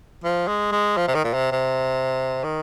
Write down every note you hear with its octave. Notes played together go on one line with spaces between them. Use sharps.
F3
G#3
G#3
F3
C3
D#3
A#2
C3
C3
D#3